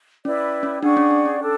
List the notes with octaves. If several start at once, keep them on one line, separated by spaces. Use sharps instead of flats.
C#4 E4 B4 D5
C#4
D4 G#4 D5 F#5 C#6
C#4
C#4
C#4
D4 A4